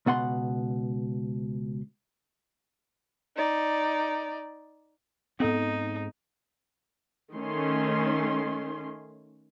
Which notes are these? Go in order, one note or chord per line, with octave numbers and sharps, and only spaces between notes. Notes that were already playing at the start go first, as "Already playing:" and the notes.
C#2 B2 F#5 C6
D#4 D5
G#2 B3 C4 D#4 A4
D#3 A3 C#4 C6